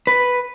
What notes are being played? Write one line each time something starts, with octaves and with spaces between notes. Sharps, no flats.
B4